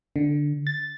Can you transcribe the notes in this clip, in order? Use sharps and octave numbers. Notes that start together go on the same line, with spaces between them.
D3
A6